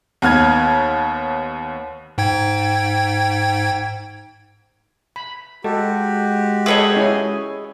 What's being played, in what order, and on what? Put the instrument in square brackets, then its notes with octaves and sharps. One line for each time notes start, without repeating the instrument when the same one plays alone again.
[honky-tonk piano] D#2 B3 F6 G#6
[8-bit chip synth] G#2 G5 G#6
[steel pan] B5
[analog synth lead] G#3 [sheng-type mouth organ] F#4 G4 [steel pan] A4
[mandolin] G#4 C#5 D#5 [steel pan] A4 B4 E5
[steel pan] C#4 E4 G#5